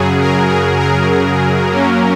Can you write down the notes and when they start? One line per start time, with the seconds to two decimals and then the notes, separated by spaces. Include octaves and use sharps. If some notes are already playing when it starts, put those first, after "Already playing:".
Already playing: F#2 C#3 F#3 G#4
0.20 A#4
0.49 G#4
0.80 A#4
1.70 F#2 F#3 A#3 C#4